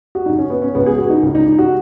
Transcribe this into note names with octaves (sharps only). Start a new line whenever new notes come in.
F#4
F#2 C#3 D#4
C#4
B3
C#4
C#2 C#3 B3
G#4
F#4
D#4
C#2 C#3
D#4
D#4
F#4